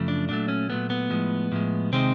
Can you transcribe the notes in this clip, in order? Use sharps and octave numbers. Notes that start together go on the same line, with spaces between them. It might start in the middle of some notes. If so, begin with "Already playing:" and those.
Already playing: F#2 C#3 F3 A3
D4
A#2 F#3 A3 D4
C#4
A#2 F#3 A3 B3
B3
A2 F3 G#3
A2 F3 G#3
C3 D#3 G#3 C4